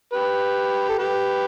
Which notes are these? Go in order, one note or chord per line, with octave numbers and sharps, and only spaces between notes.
G4 B4
A4
G4 B4